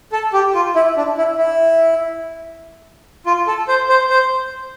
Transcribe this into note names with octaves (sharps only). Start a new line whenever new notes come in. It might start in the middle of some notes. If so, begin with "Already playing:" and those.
A4
G4
F4
E4
D4
E4
E4
F4
A4
C5
C5
C5